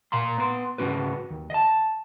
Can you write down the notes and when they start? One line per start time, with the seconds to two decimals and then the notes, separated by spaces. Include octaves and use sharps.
0.12 A#2 F5 A#5 C6
0.38 B3 C6
0.78 C#2 G#2 C#3 C#4 F#4 B4
1.30 D#2
1.50 D#5 A5